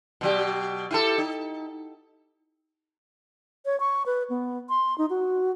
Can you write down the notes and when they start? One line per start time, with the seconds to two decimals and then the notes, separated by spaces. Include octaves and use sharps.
0.21 B2 F#3 G4
0.91 E4 G4 A4
1.18 D#4
3.66 C#5
3.80 C#6
4.06 B4
4.30 B3
4.69 C6
4.98 D#4
5.10 F#4